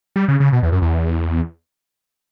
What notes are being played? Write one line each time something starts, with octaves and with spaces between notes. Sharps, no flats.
G3
C#3
C#3
B2
E2
F#2
E2